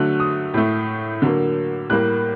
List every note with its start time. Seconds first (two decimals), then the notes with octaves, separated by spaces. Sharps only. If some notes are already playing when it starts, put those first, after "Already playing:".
Already playing: D3 F#3 A3 F#6
0.20 D#6
0.54 A2 A3
1.22 D3 F#3 A#3
1.90 A2 G3 A#3 F#6